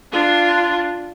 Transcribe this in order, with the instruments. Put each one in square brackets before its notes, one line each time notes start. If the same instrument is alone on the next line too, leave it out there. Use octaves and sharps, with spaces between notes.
[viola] D4 F4